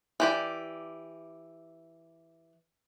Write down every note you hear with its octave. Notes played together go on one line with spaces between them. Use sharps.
E3 G4 D5